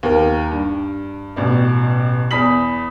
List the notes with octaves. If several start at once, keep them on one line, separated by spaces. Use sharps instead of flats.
D#2 A#4
G2
A1 B2 D5
E2 B5 D#6 B6 F#7